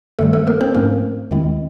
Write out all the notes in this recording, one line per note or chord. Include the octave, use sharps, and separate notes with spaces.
G2 D#3 G3 A3 A4
A3 A4
A#3 A#4
C4 C5
G#2 F3 A3 A#3 C#4 A#4
D#2 D#3 G#3 C4 E4